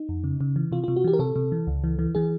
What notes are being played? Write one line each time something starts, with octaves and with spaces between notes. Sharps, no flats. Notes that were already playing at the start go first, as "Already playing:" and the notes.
Already playing: D#4
F2
C#3
C#3
E3
C3 F4
C3 F4
F#4
E3 G4
A#4
C3 A4
C3
E3
C#2
E3
E3
E3 G#4